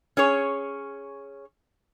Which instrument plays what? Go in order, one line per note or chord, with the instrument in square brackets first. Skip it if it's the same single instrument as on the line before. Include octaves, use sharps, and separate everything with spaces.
[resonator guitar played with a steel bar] C#4 G#4 C#5